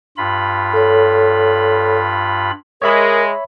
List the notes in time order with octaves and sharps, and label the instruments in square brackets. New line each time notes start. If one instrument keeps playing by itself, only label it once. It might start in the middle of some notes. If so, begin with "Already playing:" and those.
[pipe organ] G2 F4 B5
[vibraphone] A4 C#5
[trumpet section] G#3 [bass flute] A#4 [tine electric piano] C#5 E5 B5